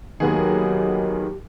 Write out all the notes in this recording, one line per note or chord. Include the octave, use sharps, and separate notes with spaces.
D#2 D#3 F#3 B3 G4 G#4